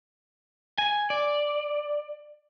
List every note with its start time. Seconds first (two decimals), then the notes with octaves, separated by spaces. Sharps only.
0.78 G#5
1.10 D5